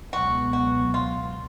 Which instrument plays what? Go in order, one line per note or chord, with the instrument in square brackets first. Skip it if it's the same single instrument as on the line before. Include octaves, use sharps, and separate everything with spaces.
[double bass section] C#2 B2 F#3 B3 [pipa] F#4
[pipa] F#4
F4